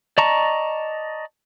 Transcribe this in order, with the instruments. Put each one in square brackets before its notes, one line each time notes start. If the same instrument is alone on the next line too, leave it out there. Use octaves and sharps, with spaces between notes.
[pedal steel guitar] D5 D#5 A5 A#5 C#6